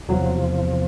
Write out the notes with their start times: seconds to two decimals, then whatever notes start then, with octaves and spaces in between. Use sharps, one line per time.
0.08 E2 C3 F3 F#3